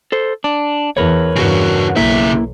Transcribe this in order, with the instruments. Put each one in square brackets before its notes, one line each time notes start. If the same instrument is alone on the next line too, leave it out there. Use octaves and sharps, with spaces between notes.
[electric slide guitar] A4 C5
D4
[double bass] E2 [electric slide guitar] A#4 B4 C#5
[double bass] E2 G2 [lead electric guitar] C#3 F#4
[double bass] B1 [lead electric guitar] C#3 E5 [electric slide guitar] A#3 E4